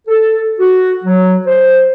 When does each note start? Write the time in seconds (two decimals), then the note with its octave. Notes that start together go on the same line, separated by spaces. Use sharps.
0.08 A4
0.60 F#4
1.05 F#3
1.47 C5